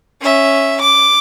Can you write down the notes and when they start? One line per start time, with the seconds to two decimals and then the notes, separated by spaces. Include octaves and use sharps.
0.21 C#4 E5
0.81 D6